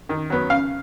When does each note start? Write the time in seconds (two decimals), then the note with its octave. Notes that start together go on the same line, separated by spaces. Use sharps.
0.09 D#3
0.30 F#3 B3
0.50 C#3 F5